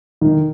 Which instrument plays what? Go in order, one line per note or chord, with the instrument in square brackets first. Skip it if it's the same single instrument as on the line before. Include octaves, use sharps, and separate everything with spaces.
[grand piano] D#3